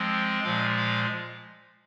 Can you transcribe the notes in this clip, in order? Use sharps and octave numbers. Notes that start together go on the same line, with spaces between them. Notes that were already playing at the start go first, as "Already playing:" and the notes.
Already playing: F3 G#3 C4
A#2 F3 G#3 F5
F5